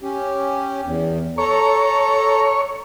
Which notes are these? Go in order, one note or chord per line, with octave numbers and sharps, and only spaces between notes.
C#4 G4
E2
A4 C#5 A#5